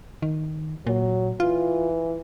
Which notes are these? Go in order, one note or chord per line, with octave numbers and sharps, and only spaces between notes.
D#3
A#2 F#3
E3 F4